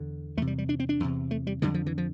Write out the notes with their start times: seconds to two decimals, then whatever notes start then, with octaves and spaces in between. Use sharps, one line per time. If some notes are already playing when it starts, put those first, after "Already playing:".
Already playing: E2 D3
0.37 E2 A3
0.42 C3
0.47 G3
0.58 G3
0.69 D4
0.80 C4
0.89 D4
1.00 E2 C3
1.31 A3
1.47 G3
1.62 F2 D3 G3
1.74 F3
1.86 E3
1.98 F3